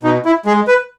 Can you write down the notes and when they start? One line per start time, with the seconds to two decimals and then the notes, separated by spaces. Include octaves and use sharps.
0.03 B2 D#4
0.25 E4
0.46 G#3 G#4
0.67 B4